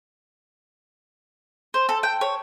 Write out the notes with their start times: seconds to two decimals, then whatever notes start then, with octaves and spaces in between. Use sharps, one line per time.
1.74 C5
1.89 A4
2.03 G5
2.21 C#5